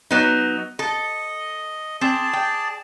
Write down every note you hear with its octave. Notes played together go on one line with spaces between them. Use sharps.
F#3 B3 D#4
A4 D#5
C4 G#4 D5 A5
G5